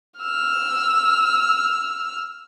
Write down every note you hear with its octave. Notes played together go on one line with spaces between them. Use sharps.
E6 F6